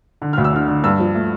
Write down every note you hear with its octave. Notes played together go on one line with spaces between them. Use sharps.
D3
D2 F6
E6
D3 F6
D3
G2 E6
F3
A3